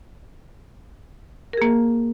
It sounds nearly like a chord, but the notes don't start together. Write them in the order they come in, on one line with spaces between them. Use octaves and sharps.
A#4 G#4 A#3